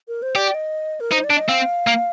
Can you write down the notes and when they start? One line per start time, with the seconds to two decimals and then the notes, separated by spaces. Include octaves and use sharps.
0.08 A#4
0.22 C5
0.36 G4 D5
0.54 D#5
1.00 A#4
1.11 D#4 C5
1.24 D5
1.30 D4
1.37 D#5
1.49 C4 F5
1.87 A#3